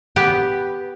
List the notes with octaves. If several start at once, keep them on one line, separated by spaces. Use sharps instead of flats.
B3 G4 B4